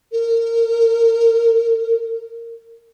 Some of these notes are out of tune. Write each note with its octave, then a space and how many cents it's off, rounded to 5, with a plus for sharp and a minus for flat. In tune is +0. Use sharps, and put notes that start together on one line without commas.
A#4 -25